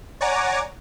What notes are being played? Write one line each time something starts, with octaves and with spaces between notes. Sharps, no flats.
C#5 D5 F#5 G#5 A#5 D6